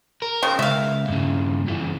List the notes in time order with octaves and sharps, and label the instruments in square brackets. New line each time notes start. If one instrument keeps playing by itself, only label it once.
[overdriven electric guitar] A#4
[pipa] C#3 F3 C4
[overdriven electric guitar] C#2 [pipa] E5 F5
[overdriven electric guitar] G2 C#3
F#2 E3